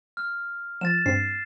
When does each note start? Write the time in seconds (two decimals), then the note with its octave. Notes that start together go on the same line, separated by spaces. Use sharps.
0.17 F6
0.81 F3 A6 E7
1.06 G2 C4 C7